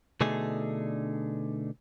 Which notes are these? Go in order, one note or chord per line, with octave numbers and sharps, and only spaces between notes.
B2 D3 A3 D4 D#4 G#4